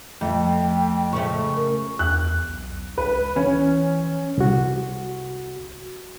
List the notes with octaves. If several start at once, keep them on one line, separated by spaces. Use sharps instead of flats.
F2 A3 G5
C#3 F3 A3 C#6
A#4
E2 F#6
B1
C#2 B4
E3 C#4
C2 F#4